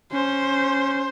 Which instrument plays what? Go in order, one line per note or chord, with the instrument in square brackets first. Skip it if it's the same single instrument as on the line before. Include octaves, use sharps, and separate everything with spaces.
[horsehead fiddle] C#4 [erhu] C5